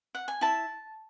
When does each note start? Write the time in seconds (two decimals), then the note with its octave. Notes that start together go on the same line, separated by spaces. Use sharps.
0.15 F#5
0.28 G#5
0.41 E4 A5